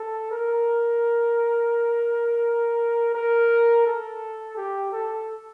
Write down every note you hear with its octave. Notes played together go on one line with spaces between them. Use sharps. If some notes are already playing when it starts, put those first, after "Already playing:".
Already playing: A4
A#4
A#4
A4
G4
A4